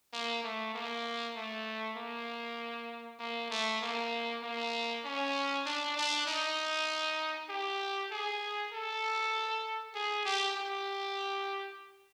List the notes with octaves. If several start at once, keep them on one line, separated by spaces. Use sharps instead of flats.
A#3
A3
A#3
A3
A#3
A#3
A3
A#3
A#3
C#4
D4
D4
D#4
G4
G#4
A4
G#4
G4
G4